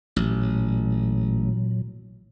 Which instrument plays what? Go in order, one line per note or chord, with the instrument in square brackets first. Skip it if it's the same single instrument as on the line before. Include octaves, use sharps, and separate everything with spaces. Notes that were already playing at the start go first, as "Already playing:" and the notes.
[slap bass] A1 [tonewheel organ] A#2 F#3